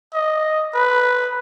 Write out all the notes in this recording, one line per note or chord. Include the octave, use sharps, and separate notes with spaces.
D#5
B4